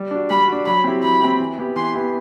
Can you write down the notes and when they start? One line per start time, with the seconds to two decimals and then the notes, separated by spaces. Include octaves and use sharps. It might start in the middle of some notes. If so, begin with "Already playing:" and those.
Already playing: G3
0.11 D4 F#4
0.30 G3 B5
0.48 D4 F#4
0.66 F#3 B5
0.84 C4 E4 G4
1.03 F#3 B5
1.21 C4 E4 G4
1.40 E3
1.58 B3 E4 G4
1.76 E3 C6
1.94 B3 E4 G4